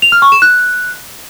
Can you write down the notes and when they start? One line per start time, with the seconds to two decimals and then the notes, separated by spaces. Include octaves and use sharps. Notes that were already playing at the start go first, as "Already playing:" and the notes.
0.02 F7
0.12 F6
0.22 C#6
0.32 E7
0.42 F#6